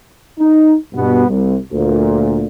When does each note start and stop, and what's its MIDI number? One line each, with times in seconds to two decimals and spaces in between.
0.39 0.74 63
0.95 1.27 43
0.95 1.27 47
0.95 1.27 59
1.28 1.55 36
1.71 2.47 38
1.71 2.47 46